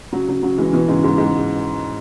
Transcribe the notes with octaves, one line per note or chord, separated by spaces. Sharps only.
C#3 F#3
C#3 F#3
C#3 F#3
E3 G#3
B2 E3
G#2 C#3
G#2 C#3
G#2